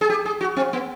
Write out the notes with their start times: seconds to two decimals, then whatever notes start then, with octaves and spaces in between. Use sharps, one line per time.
0.01 G#4
0.10 G4
0.26 G#4
0.41 F#4
0.57 C4
0.73 B3